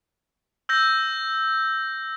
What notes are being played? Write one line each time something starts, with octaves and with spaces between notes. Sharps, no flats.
E6 G6 A#6